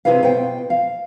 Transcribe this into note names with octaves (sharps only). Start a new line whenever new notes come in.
C3 E4 G#4 B4 F5
B2 C5 G5
F5